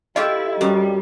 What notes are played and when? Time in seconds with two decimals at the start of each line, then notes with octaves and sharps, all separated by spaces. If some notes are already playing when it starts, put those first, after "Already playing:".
0.16 E4 F4 G4 A4 D#5
0.61 F#2 G3